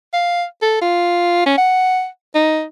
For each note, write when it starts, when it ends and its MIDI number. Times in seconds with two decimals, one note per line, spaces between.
0.14 0.45 77
0.62 0.79 69
0.82 1.43 65
1.46 1.55 61
1.58 2.07 78
2.35 2.63 63